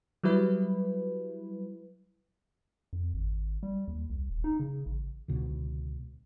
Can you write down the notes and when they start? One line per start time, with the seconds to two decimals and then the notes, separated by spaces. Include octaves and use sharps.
0.24 F#3 G3 E4 B4
2.93 F2
3.14 G#1
3.63 G3
3.88 D#2
4.10 C2
4.30 D#1
4.44 D#4
4.60 C#3
4.86 A1
5.28 C#2 B2 D3